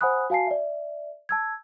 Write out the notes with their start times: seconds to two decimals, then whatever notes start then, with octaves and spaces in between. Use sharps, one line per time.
0.01 C5 F#5 G#5 B5 D#6 F#6
0.30 F#4 F5 G#5 A5 C7
0.47 D5 E5
1.29 A5 E6 G#6